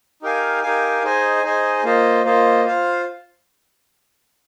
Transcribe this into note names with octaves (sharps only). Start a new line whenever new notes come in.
D#4 G4 A#4 F5 G#5
D#4 G4 A#4 F5 G#5
D#4 G#4 C5 D#5 G#5
D#4 G#4 C5 D#5 G#5
A#3 F4 C5 D#5
A#3 F4 C5 D#5
F4 C5 F5